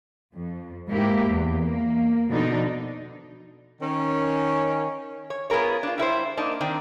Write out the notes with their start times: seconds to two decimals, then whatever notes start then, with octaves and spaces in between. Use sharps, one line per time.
0.34 F2
0.88 G#2 A#3 E4 G4
1.28 E2
1.61 A#3
2.29 B2 D3 F3 D4 D#4
3.82 D#3 C#4
5.30 C#5
5.50 B3 F4 G#4 A#4 C#5
5.83 D4 F4
5.98 G3 E4 B4 C5
6.37 A#3 D4 D#4
6.61 D#3 C4 D4